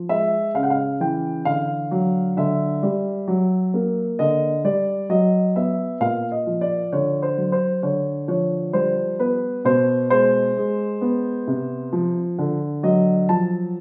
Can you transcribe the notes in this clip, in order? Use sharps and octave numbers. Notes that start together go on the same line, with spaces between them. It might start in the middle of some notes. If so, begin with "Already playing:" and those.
Already playing: F3
G#3 E5
C#3 F5
F#5
F5
E3 G5
D3 F5
F#3
D3 E5
G3
F#3
A#3
D3 D#5
G3 D5
F#3 D#5
B3 E5
A#2 F5
D#5
F3
D5
D3 C#5
C5
F#3
C5
D3 C#5
F3 C#5
G3 C5
B3 B4
B2 C5
G#3 C5
G#3
B3
C3
F3
D3
F#3 D#5
F3 A5